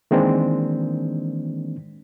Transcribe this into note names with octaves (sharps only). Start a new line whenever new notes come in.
D#3 E3 G#3 A#3 C4 D4